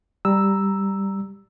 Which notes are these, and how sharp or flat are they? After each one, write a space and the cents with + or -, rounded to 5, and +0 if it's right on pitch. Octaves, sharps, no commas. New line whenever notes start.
G3 +0 A#5 +0 E6 +0